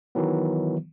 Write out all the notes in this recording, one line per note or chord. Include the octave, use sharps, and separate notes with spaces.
D#3 E3 F#3 B3